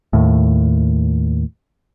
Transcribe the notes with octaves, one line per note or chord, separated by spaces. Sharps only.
D#2 A2